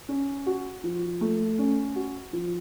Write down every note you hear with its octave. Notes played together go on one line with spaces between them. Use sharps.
C#4
F#4
F3
A3
C#4
F#4
F3